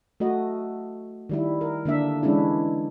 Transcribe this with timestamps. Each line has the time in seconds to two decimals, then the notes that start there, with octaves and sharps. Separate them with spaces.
0.20 A3 F#4 D#5
1.29 D#3 G3 E4
1.61 A#4
1.85 D3 A#3 D4 E5
2.23 E3 G#3 C#4 D4 E4